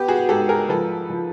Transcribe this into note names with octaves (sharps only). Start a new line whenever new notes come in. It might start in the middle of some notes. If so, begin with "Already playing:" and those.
Already playing: B3 G4
F#4 G#4
G#2 G4 A4
G#4 A#4
F3 A4 B4
F3